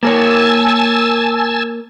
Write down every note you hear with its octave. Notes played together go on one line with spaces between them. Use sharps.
A#3 A#4 C#5 G#5 A5 E6